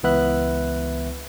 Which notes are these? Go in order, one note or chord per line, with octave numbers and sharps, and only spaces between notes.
C#2 E3 B3 B4 E5 F#6